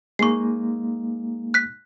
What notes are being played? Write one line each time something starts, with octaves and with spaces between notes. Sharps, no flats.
G#3 A#3 D#4 C#6 C7
F#6 B6